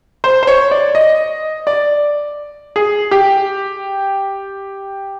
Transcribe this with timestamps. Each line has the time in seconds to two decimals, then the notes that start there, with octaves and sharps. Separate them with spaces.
0.24 C5
0.43 C5
0.47 C#5
0.71 D5
0.95 D#5
1.67 D5
2.76 G#4
3.11 G4